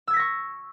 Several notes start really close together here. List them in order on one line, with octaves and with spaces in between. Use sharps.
E6 G#6 B6 A#6 C#6